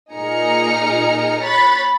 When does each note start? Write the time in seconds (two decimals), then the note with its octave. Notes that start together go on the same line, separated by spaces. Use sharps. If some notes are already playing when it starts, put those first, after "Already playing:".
0.12 A#2 D#4 G#4 A#5 F6 C#7
1.44 C#5 B5 F#6 A6 B6